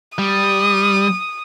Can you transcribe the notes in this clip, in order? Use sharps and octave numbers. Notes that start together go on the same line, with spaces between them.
G3 D#6